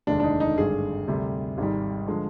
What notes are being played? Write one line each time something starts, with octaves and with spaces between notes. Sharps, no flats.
F1 D#2 D3 G#3 D4
D4
D#4
D#4
G#1 G2 D3 G#4
D2 C3 G3
G#1 G#2 G3
D3 F3 G#3